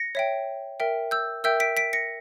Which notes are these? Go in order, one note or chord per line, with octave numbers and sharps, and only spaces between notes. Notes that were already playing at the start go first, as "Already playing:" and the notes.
Already playing: A#6 C#7
C#5 E5 G5
A#4 E5 G5
E6 G6
A#4 E5 G5 E6 G6
B6 D7
B6 D7
A#6 C#7